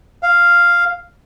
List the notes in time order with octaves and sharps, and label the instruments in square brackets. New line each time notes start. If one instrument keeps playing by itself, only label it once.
[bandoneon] F5